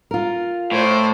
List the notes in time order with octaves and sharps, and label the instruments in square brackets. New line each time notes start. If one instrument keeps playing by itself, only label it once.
[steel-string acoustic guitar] F4 A#4
[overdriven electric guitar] A2 [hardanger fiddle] C5 D5